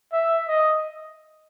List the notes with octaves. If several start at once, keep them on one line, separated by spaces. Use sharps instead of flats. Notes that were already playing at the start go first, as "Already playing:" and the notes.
E5
D#5